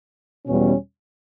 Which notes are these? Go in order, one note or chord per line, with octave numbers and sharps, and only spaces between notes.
E2 B2 G3 C#4